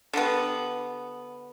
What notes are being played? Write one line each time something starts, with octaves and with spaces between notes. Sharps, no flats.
D3 G3 B3